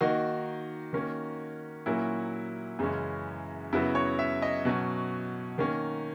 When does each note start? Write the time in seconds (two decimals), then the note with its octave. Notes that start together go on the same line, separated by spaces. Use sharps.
0.01 D#3 A#3 D#4 F#4
0.93 D#3 A#3 C#4
1.86 A#2 F#3 A#3 C#4 E4
2.79 F#2 C#3 E3 G#3 C#4
3.73 F#2 C#3 F#3 B3 E4
3.95 C#5
4.19 E5
4.42 D#5
4.65 B2 F#3 C#4
5.58 D#3 A#3 C#4